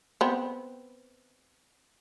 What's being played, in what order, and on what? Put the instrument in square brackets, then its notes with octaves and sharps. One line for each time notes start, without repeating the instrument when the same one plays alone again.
[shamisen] B3 C4